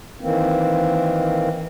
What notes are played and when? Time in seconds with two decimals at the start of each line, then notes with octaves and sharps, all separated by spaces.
0.21 D#3 E3 A#3 C4